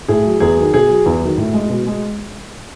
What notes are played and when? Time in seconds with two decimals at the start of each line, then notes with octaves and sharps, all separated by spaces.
0.08 A2 G#4
0.25 F#3
0.40 E2 G#4
0.57 D#3 F#3
0.73 B2 G#4
0.90 F#3
1.06 E2
1.22 D#3 F#3
1.38 A2
1.54 G#3
1.70 B2
1.87 G#3